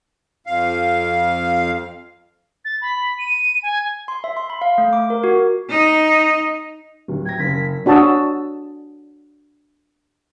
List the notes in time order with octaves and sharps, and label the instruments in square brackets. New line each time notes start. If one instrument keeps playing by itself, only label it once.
[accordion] F2 F5
[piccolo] A6
B5
D#7
G#5
[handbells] C6
E5
C6
B5
F5
A3
D6
A#4
F#4
[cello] D#4
[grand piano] D1
[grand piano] G5 A#6 [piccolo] G#6
[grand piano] F#1 [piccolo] B6
[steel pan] D4 F#4 C#5 A5 D#6 E6